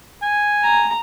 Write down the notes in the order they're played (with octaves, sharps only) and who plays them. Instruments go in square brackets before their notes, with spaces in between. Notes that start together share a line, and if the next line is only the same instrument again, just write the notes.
[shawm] G#5
[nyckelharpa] A#5